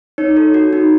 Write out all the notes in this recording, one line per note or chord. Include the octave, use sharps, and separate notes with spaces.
D#4 C#5
A4
F#4
D#4